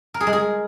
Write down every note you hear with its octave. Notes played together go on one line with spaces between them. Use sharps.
A#4
G#4
G#3
G#4